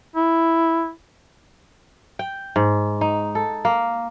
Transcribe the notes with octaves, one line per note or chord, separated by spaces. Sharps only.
E4
G5
G#2
D#4
A4
A#3